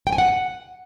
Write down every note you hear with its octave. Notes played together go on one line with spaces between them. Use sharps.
G5
G#5
F#5